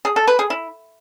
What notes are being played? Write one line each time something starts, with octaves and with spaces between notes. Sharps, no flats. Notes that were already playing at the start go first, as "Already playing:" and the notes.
G#4
A4
B4
G#4
E4